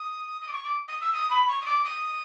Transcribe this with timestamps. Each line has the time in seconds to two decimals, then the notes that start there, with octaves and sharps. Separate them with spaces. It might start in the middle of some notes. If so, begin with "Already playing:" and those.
Already playing: D#6
0.41 D#6
0.48 D6
0.52 C#6
0.63 D6
0.87 D#6
1.01 E6
1.12 D#6
1.30 B5
1.48 C#6
1.61 D#6
1.65 D6
1.84 D#6